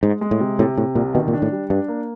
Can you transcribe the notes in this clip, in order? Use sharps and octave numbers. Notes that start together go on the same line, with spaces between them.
G#2 G#3
G#3
A2
C3
A2 C3
A2 C3
C2 A#2
B2 D#3
A#2
D4
A2
G3
G2 D4
A#3